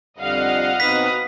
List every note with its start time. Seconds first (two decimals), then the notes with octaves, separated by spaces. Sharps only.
0.18 F2 D3 G3 D#5 F5 F#5
0.80 B2 C4 D#4 B4 D#6 B6